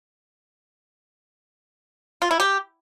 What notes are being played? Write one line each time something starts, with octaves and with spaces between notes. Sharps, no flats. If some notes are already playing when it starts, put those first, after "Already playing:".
F4
E4
G4